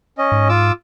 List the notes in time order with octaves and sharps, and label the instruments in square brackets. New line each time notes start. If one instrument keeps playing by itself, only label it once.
[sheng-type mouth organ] C#4 D#5
[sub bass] G#2
[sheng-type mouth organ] F4 D6 E6